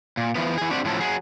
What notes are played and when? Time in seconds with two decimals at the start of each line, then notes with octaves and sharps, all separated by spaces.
0.17 A#2
0.35 E3 F3 B3
0.58 E3 G#4
0.71 A3 C4 D4 F#4 G4 D5
0.85 A2 F3 F#3 C#4 A4
1.00 F#3 G#4